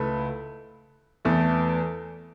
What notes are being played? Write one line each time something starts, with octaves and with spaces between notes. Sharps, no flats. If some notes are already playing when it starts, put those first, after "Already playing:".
Already playing: C#2 A3 E4 B4
E2 E3 A3 E4